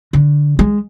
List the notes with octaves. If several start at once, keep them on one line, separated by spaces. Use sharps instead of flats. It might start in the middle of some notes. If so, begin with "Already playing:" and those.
D3
G#3